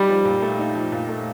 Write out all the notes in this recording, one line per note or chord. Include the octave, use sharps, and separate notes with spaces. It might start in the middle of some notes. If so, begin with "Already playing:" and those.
Already playing: G3 D#4
F3
A#2
A3
D#4
F3
A#2
A3